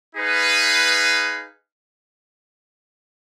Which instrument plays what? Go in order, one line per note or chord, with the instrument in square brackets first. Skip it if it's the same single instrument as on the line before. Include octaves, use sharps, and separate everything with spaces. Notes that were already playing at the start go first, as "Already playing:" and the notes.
[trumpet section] D#4 G#4 B4 F5